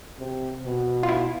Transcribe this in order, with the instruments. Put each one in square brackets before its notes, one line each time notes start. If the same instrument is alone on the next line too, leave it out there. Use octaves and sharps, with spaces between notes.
[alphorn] C3
B2
[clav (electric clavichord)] F4
E4